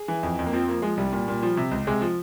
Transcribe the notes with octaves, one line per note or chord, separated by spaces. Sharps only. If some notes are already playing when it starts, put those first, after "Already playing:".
Already playing: G#4
E3
F2
F2
A#3
F3 C4
F3 A#3
F3 G#3
C2 G3
A#2
A#2
F3
C3
C#2
C3 G#3
F3